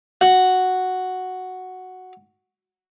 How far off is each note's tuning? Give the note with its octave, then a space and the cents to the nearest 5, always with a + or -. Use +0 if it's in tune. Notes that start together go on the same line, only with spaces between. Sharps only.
F#4 +0 F#5 +0